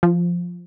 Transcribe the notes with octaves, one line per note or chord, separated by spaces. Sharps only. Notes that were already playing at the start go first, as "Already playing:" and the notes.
F3